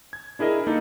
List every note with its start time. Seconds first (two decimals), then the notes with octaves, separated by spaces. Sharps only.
0.13 G#6
0.39 D4 E4 G#4 A#4 D#5
0.67 A#3 D#4 A4